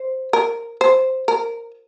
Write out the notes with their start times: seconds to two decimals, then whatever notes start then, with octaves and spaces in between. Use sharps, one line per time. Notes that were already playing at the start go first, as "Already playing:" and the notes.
Already playing: C5
0.33 A#4
0.81 C5
1.28 A#4